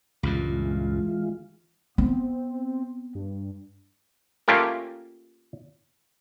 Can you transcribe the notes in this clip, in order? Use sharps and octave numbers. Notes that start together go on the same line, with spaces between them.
C#2 G2 A#2 E3 G#3 F4
B3 C4
G2
A3 A#3 C#4 F4 G4 A#4